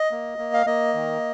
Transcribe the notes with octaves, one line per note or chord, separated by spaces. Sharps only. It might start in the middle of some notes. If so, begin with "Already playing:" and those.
Already playing: D#5
A#3
A#3
F5
A#3 D#5
D#3